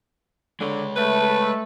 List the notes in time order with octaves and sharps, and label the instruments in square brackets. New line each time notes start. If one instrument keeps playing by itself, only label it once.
[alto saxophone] D3 [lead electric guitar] G#3 C#5
[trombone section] A3 [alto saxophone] B4